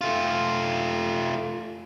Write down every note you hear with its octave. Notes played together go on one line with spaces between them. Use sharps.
A3 F4